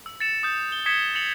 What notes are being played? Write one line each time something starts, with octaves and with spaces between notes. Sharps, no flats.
E6
A6 C#7 E7
D#6 G6
G7
D#6 G#6 B6 C#7 E7 G7
A6 C#7 F7 F#7